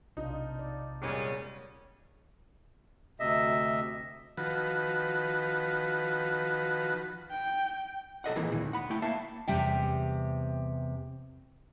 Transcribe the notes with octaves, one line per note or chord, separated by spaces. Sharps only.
B1 C3 D4 D#4 F4
D5
E2 A#2 G3 G#3 C#4
D2 C3 D#5 E5
D#3 F3 F#4 B4
G5
B1 A4 D#5 F#5
A#2 D#3 E3 G#3 C4
D2 A#2 D#3 E3
F#5 B5
A3 E4 G5
A#3 E5 F5 A5
E2 C3 G3 E5 G5